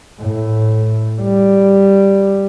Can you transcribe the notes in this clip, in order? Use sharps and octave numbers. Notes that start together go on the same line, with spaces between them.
A2
G3